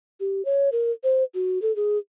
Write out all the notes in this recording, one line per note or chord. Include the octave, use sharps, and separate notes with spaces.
G4
C#5
A#4
C5
F#4
A4
G#4